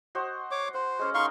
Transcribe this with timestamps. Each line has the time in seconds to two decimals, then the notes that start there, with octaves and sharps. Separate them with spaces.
0.15 F#4 C5 D#5
0.51 C#5 D6
0.74 C5 F#5
0.99 G#3 C#4 C#5
1.14 D#4 A#4 D#5 F5 C6 C#6